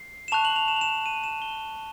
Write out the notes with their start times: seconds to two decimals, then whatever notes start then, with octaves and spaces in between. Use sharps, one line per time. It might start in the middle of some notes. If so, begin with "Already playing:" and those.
Already playing: C7
0.28 E7
0.32 A5 C#6 F#6 F7
0.45 F#7
0.56 F7
0.68 E7
0.76 F7
0.81 E7
1.06 D#7
1.24 E7
1.42 G7